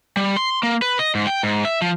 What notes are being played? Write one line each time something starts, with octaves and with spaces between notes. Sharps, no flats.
G3
C6
A#3
B4
D#5
G#2
G5
G#2
E5
F3